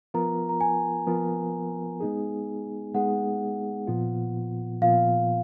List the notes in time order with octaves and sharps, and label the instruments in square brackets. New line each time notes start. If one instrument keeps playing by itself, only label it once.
[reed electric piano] F3 B3 F4 A#4 [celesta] A#5
[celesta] A#5
G#5
[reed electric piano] F3 B3 F4 A#4
G#3 B3 D#4 G#4
[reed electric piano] G#3 B3 D#4 G#4 [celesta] F#5
[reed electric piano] A#2 F3 B3 F4
[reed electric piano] A#2 F3 B3 F4 [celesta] F5